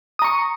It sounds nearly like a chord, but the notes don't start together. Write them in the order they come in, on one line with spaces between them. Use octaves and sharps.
D#6 A#5 C#6